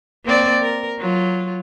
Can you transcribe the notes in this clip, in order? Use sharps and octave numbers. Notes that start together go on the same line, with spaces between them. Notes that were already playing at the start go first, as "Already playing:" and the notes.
A#3 C4 D5
A#4
F#3 F4